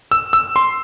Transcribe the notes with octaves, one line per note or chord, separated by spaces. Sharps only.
E6
E6
C6